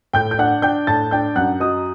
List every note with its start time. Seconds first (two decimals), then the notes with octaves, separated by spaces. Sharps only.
0.13 A2 G5 G6
0.31 G6
0.38 D4 F#5 F#6
0.62 D4 G5 G6
0.87 A2 A5 A6
1.11 D4 G5 G6
1.36 F#2 F#5 F#6
1.60 F#3 D#5 D#6